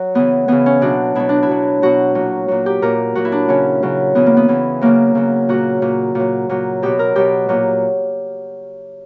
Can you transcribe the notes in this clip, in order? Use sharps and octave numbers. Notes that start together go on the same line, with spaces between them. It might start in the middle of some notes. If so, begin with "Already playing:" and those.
Already playing: F#3
C#3 E3 B3
C#3 E3 B3
C#4
B2 F#3 D4
B2 F#3 E4
D4
E4
B2 F#3
B2 F#3 F#4
A#2 F#3
A#2 F#3
G4
A#2 F#3 A#4
A#2 F#3 F#4
E4
D4
C#3 F#3 C#4
C#3 F#3
C#3 E3 B3
A#3
B3
C#3 E3
C#3 F#3 A#3
C#3 F#3
A#2 F#3 F#4
A#2 F#3
A#2 F#3
A#2 F#3
B2 F#3 G4
A#4
B2 F#3 G4
A#2 F#3